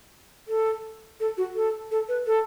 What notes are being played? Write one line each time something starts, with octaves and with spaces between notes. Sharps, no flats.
A4
A4
F#4
A4
A4
B4
A4